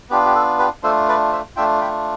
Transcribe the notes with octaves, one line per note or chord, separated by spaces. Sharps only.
B3 D4 F4 G4
G4
A4
G4 B4
A3 D4 F4 A4 C5
B4 D5
C5 E5
A3 D4 F4 E5 G5
G5 B5